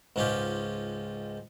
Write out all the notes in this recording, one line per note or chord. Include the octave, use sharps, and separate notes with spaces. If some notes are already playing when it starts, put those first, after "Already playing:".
C#2 G#2 C#4 F4 G4 G5